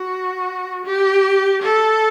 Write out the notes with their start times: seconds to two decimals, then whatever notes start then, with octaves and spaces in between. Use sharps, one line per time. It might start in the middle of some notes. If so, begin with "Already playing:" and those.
Already playing: F#4
0.85 G4
1.62 A4